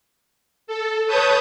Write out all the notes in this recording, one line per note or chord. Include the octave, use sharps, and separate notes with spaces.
A4
B4 C#5 A5 D#6 G6